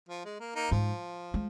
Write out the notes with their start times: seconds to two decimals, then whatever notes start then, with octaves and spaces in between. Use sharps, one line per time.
0.09 F3
0.25 G#3
0.40 A#3
0.55 A#3 D#4
0.71 G#2 F3
1.34 G#3